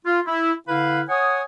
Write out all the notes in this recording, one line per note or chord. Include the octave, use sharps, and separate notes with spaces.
F4
E4
D3 E4 B4 F5
C#5 F#5 G#5 D#6